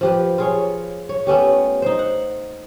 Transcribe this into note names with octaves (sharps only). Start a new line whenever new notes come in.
F3 G4 B4
F4 G#4 C#5
C#5
A3 B3 C#4 G4
D#4 C5
F#5